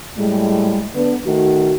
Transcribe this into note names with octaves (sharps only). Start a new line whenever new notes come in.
A2 G3 G#3
D3 B3
D#3 A3 F#4